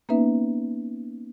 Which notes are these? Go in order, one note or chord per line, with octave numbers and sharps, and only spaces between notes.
A#3 B3 C#4 D#4 B4 E5